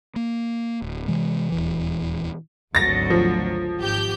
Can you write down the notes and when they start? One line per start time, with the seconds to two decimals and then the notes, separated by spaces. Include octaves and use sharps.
0.16 A#3
0.82 D1
1.08 C3 E3 G#3
1.52 D#1 E2 E3
2.75 G#1 D2 F#3 A6 A#6
3.10 F3
3.79 G#1 G4 G6